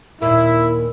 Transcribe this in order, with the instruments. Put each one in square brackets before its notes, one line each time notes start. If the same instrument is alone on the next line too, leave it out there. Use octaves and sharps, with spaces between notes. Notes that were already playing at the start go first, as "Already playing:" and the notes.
[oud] D#2 A#2 A#3 [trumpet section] E4